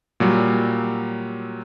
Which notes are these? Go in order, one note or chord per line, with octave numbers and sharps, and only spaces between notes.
A#2 F#3 G3